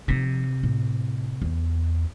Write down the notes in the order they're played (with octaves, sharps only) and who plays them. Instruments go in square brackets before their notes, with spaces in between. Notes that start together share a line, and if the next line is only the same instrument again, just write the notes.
[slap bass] C3 [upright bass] F3 D#4
[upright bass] A2
E2